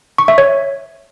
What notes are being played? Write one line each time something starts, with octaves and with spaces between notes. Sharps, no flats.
C#6
E5
C#5